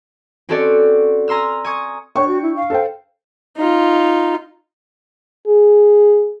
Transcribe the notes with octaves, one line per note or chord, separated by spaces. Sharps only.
C4 C#4 F#4 A4 C#5 D5
G#5 A#5 C6 E6 F6
G#5 C#6 D#6 G#6
D4 C#5 G5 C#6
F#4
E4
F5
A4 C5 G5
D#4 F4
G#4